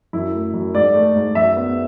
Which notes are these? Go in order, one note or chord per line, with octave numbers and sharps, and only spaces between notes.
F#2 E4
A3
F#2
G#2 D5
A3
G#2
F#2 E5
B3